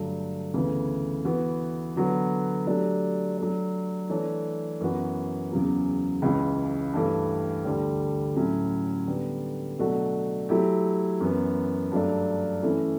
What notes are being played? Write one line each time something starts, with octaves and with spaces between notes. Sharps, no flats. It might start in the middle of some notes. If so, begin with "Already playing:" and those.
Already playing: G2 D3 F#3 A3 D4
D2 C#3 E3 B3
E3 B3 F#4
D3 F#3 B3 F#4
F#3 A3 D4 G4
F#3 A3 D4
E3 A3 D4 A4 C#5
F#2 E3 B3 F#4 B4
E2 C#3 F#3 C#4
C#2 C#3 E3
G2 E3 A3
D2 D3 G3
A2 F#3 C#4 E4
D3 G3 B3
B2 F#3 A3 D4 F#4
F#3 A3 E4 G4
F#2 E3 B3
G2 F#3 A3 D4
E3 A3 C#4 E4